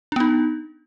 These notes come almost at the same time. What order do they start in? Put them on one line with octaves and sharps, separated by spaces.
D4 B3 D#4